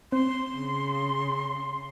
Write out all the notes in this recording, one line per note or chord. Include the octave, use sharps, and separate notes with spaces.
C4 C6
C#3